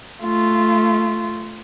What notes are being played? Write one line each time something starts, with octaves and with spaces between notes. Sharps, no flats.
A3 F4